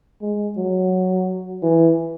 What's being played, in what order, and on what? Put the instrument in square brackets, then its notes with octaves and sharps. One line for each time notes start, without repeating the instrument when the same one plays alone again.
[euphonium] G#3
F#3
E3